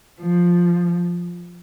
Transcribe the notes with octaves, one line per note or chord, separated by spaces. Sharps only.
F3